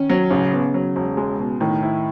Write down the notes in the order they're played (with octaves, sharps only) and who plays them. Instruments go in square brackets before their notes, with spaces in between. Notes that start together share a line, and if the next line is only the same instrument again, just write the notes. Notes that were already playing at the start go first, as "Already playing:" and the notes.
Already playing: [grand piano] D#3 [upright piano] C#4
[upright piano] F#3
[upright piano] A1 [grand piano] C#3
[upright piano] B3
F#3
E1
G#3
B2
[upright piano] A2 [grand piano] D#3
[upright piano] E4